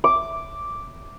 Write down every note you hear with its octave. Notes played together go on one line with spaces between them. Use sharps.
D6